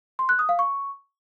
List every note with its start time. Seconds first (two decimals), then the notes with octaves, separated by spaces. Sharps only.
0.19 C6
0.29 F#6
0.39 D#6
0.49 F5
0.59 C#6